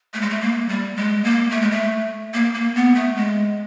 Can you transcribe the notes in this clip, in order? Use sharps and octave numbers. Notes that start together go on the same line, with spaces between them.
A3
G#3
A3
A#3
G3
G#3
A#3
A3
G#3
A3
A#3
A#3
B3
A3
G#3